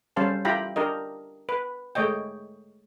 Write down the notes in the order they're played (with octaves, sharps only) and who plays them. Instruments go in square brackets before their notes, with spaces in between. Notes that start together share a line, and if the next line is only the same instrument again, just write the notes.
[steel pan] G3 C#4 C5 F5 A5
E4 F4 G4 G5 A#5 B5
D4 G4 A#4 D#5
B4
G#3 A3 C#5 D#5 G5